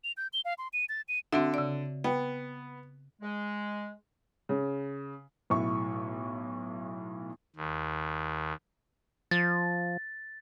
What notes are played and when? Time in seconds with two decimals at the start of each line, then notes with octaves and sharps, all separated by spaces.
0.04 F7
0.17 G6
0.33 G7
0.45 F5
0.58 C6
0.73 D#7
0.89 A6
1.08 D#7
1.33 D3 C4 F#4 E5
1.54 C#3 D5
2.04 B3 G5
3.22 G#3
4.49 C#3
5.50 B1 A2 E5 C#6
7.56 D#2
9.31 F3 A6